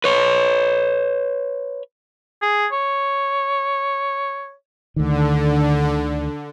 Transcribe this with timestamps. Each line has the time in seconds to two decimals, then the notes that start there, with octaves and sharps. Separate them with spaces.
0.04 B4 C#5
2.42 G#4
2.73 C#5
4.96 D2 D3 D#3